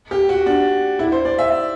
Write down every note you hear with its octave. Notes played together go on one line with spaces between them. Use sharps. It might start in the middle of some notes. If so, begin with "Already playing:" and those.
G4
F#4
D4
E4
C5
D5
E5